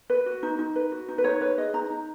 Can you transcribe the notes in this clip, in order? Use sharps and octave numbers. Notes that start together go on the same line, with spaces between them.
B4
F#4
D#4
D#4
B4
F#4
D#4
B4
D#4 C#5
B4 C#5
G#4 D#5
D#4 A#5
D#4